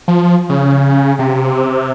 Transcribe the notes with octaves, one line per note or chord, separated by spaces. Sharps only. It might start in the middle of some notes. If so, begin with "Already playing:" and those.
F3
C#3
C3